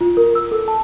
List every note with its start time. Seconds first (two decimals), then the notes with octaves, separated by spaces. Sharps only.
0.01 F4
0.17 A#4
0.35 E6
0.52 A4
0.68 A5